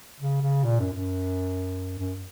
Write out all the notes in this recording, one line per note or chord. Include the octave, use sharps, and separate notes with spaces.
C#3
C#3
A#2
F#2
F#2
F#2